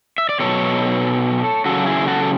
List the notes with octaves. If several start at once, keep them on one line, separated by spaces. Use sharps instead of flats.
E5
D5
B2 F#3 A4 C#5
C#3 F#3 F#4 A4
E4 G#4
F#4 A4